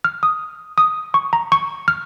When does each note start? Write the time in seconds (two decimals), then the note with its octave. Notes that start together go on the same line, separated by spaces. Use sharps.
0.04 F6
0.23 D#6
0.78 D#6
1.14 C#6
1.33 A#5
1.52 C#6
1.88 F6